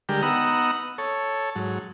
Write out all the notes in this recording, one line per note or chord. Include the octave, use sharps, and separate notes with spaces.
D3 G3 G#3 G4 A#4
B3 D#4 F#5 A#5 D#6 E6
A4 C#5
G#2 F#3